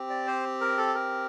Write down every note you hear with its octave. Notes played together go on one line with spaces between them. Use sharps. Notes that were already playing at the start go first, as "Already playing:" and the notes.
Already playing: C4 G4
D5
C5
A#4
A4
A#4